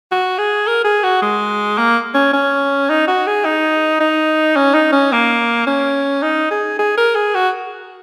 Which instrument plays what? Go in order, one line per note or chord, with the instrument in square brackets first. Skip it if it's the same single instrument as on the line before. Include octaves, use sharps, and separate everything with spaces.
[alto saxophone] F#4
G#4
A#4
G#4
F#4
G#3
A#3
C#4
C#4
D#4
F#4
G#4
D#4
D#4
C#4
D#4
C#4
A#3
C#4
D#4
G#4
G#4
A#4
G#4
F#4